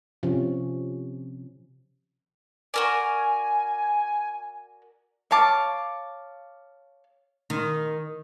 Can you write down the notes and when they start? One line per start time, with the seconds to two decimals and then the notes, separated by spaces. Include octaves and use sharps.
0.23 C3 F3 C#4
2.74 F#4 A#4 D5 G#5
5.31 C#5 F5 A5 D6
7.50 D#3